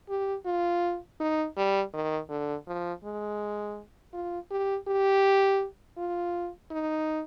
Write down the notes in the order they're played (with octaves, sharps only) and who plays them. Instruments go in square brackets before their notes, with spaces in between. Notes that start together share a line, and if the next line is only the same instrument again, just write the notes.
[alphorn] G4
F4
D#4
G3
D#3
D3
F3
G#3
F4
G4
G4
F4
D#4